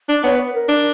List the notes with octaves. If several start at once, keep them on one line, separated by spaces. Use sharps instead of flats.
D4
B3 C#5
B4
A#4
D4